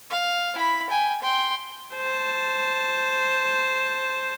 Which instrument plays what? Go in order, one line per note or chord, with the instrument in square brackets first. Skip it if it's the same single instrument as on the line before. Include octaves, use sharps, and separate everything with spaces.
[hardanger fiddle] F5
E4 B5
G5 G#5
G5 C6
[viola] C5 A5